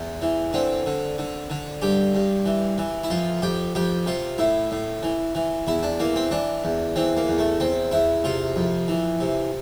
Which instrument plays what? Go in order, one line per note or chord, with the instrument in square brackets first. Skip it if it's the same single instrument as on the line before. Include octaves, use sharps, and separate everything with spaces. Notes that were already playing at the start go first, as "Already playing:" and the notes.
Already playing: [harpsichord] E2
E3
D3 C4
D3
D3
D3
G2 G4
G2
E3
E3
E4
F2 F4
F2 G4
F2 G4
C3 F4
A2 E4
A2
E3
E3
E2 E4
D4
E3 A#3
C4
E3 D4
E2
E3 C4
A#3
E2
A3
E2 C4
E2 E4
C3 F4
F2
E3
C3